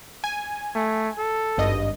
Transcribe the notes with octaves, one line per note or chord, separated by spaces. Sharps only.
G#5
A3
A4
G#1 G2 D#5